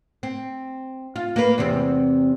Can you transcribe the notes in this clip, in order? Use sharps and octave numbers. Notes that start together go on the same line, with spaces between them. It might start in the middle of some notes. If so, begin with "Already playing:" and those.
C4
F4
A#3 B4
E2 C3 C4